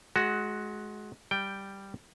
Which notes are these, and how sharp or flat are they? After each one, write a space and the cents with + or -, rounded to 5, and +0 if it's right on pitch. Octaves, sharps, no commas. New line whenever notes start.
G#3 +25 F#4 +0
G3 +0 G5 +0